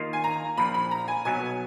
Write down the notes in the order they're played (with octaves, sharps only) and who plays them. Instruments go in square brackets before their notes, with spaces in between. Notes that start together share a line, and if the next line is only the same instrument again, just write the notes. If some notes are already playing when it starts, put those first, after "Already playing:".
Already playing: [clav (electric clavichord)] D#2 D#3 A#3 F4
[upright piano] G#5
A#5
[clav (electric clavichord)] A#1 A#2 F3 [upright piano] B5
[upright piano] B5
A#5
G#5
[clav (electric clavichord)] B1 B2 F#3 B3 [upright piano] G#5